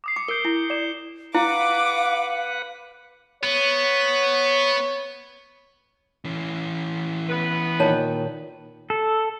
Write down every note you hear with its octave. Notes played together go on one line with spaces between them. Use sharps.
D6 D#6 C7
D6 C#7
A#4 G6 D7 G7
E4
D5 D6 E7
E4 B4 F5 F#5 D6
B3 C#5
E3 C#4
B3 B4
A#2 D#3 C#5 A5
A4